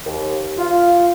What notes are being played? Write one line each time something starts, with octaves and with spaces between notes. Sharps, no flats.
D#2
F4